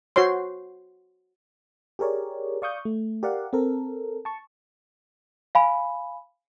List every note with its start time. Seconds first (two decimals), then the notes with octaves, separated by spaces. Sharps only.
0.16 F#4 C5 C#5 C6
1.99 G4 G#4 A#4 C#5 D5
2.62 D5 F5 C#6 D#6 G6
2.85 A3
3.23 G4 A#4 D5 F5 F#5
3.53 C4 A4 A#4
4.25 A5 C#6
5.55 F5 G#5 B5